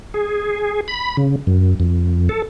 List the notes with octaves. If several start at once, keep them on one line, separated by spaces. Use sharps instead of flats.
G#4
B5
C#3
F#2
F2
A4